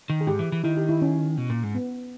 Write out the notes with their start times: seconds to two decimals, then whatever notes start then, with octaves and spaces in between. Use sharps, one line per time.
0.10 D#3
0.21 G#4
0.27 G#2 G4
0.39 E3
0.52 E3
0.64 D#3 E4
0.77 G4
0.89 E4
1.02 C#4
1.37 B2
1.50 A#2
1.63 G#2
1.75 B3